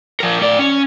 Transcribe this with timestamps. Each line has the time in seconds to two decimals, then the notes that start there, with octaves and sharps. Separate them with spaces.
0.20 F3 A#4
0.41 A2 D5
0.59 C#4